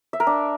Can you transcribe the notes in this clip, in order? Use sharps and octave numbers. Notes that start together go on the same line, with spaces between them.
E5
A#4
D4